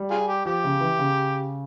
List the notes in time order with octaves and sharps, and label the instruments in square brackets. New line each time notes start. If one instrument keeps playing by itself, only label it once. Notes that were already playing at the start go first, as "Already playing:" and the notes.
Already playing: [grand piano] G3
[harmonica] F4 G#4
G4
[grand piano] F3 [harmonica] G4
[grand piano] C#3
E3
C#3